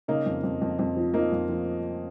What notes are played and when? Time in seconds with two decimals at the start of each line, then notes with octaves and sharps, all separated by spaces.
0.08 C#3 A#3 D#4
0.26 F2
0.44 F2
0.61 F2
0.79 F2
0.96 F3
1.14 F3 A#3 D#4
1.32 F2
1.49 F3